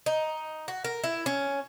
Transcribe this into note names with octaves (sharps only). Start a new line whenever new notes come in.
D#4
F#4
A#4
E4
C#4